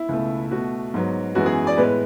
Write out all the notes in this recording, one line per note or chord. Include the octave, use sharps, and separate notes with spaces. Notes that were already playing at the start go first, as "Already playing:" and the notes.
Already playing: E4
C#2 B2 A3
B2 A3 F#4
G#2 F#3 B3
F#2 E3 G#3 B3 F#4
G#4
D5
A2 G#3 B3 B4